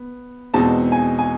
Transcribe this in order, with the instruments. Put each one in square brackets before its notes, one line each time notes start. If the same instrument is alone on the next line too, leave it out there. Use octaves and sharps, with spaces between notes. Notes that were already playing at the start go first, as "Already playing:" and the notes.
Already playing: [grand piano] B3
E2 B2 G#3 C4 D#4 A5
G#5
G#5